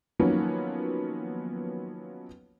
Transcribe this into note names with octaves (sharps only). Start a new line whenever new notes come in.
D#3 F3 F#3 A#3 B3 C#4